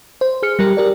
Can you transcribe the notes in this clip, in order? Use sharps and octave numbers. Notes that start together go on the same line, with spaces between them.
C5
G#4 F6 C#7
G3 G4 A#4
G4 A#4 D5